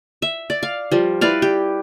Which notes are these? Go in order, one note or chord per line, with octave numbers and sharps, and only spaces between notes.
E5
D5
F5
F3 G3
E4 B4 D5 F5
G4